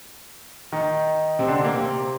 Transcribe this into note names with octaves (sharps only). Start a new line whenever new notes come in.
D#3 D#4
C3 C4
D3 D4
A#3
C3 C4